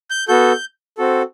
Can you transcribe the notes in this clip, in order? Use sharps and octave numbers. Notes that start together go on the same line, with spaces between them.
G6
B3 F#4 A4 G6
C4 F#4 A4